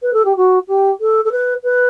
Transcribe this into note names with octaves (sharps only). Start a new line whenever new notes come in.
B4
A4
G4
F#4
G4
A4
A4
B4
B4